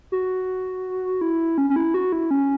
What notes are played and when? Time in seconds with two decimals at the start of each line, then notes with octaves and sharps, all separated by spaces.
0.12 F#4
1.21 E4
1.58 C#4
1.70 C#4
1.76 E4
1.94 F#4
2.12 E4
2.31 C#4